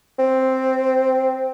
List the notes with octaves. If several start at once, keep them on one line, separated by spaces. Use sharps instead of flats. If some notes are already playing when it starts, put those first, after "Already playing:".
C4